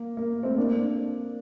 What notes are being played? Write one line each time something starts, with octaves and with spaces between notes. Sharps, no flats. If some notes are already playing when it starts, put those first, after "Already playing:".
Already playing: A#3
A#3
A3 C4
A#3 D4
A#3 D4